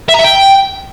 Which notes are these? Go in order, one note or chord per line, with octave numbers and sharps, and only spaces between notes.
E5
A#5
E5
G5